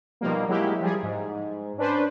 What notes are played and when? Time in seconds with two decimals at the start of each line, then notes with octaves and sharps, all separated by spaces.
0.21 B2 D#3 F3 G3 A#3
0.48 F#3 G#3 A#3 E4 G4
0.80 F3 G3 G#4
1.03 G#2
1.78 C#4 D4 B4 C5